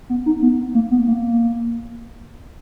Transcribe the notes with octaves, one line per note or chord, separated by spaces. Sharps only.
B3
D#4
B3
A#3
B3
A#3